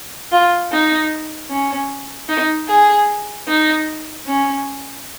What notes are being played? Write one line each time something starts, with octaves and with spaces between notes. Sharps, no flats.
F4
D#4
C#4
D#4
G#4
D#4
C#4